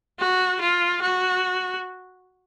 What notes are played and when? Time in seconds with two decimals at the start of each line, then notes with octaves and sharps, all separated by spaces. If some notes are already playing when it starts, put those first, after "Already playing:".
0.20 F#4
0.61 F4
1.02 F#4